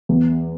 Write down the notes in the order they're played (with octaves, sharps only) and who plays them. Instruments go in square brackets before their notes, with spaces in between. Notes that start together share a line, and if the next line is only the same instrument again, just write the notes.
[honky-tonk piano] E2